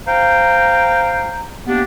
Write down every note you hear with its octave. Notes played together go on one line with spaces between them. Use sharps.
C5 F5 G5 A#5
A#3 B3 D4 G4